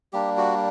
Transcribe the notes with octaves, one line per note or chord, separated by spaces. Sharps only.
G3 A#3 D4 G4
F#4